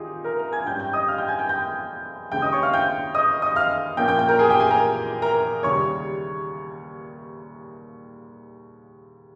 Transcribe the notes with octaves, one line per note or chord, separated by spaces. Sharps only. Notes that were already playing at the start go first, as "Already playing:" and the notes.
Already playing: C2 D#3 D#4 F4 G4 G#4
A#4 A#5
A#4 A#5
G#5 G#6
G#2 G3 C#4 G5 G6
G5 G6
D#5 D#6
F5 F6
G5 G6
G#5 G#6
G5 G6
G5 G6
D#2 C#3 G#3 C#4 G5 G6
D#5 D#6
C#5 C#6
F5 F6
G5 G6
D#5 D#6
D#5 D#6
F5 F6
A#2 F3 A#3 C#4 G5 G6
G5 G6
G5 G6
A#4 A#5
G#4 G#5
G4 G5
G#4 G#5
A#4 A#5
A#4 A#5
D#2 C#3 G3 C#5 C#6